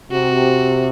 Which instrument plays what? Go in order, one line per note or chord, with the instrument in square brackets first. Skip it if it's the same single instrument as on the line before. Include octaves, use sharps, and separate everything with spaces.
[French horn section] C3 [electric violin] F#4